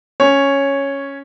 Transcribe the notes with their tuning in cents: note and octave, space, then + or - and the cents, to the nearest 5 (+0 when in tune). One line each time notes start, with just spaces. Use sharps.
C#4 +0 C#5 -5